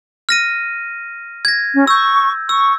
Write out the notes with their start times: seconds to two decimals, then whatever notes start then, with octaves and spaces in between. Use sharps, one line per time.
0.29 F6 A#6 D#7
1.45 G#6 A#6
1.73 C#4
1.87 C#6 E6 G6
2.49 C#6 E6